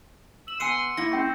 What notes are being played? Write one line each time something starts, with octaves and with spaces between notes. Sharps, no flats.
E6 F#7
B3 F#5 G#5 C6 E6 C#7 D#7
A#3 E4 A#6
C4 C#4 G5 C#6